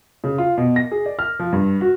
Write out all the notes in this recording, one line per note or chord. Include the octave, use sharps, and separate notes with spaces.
C#3
F4
B2
A#6
G#4
D5
F6
F3
G2
F#4